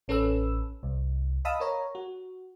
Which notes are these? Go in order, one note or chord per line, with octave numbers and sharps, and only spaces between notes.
A1 C#4 A4 B4 E6
C2
D#5 F5 A5 B5 D#6 E6
A#4 C#5 A#5
F#4